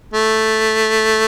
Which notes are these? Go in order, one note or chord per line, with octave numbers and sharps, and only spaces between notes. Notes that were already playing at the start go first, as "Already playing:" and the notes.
A3